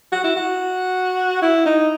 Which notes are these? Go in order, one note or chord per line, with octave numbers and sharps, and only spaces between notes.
F#4
E4
F#4
E4
D#4